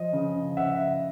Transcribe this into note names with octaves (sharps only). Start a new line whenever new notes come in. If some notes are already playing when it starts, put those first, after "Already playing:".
Already playing: F3 D#5
C#3
C#3 E5 F#5